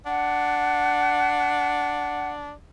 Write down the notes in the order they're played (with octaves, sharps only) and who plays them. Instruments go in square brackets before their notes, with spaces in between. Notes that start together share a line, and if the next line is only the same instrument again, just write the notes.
[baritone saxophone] D4 [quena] F#5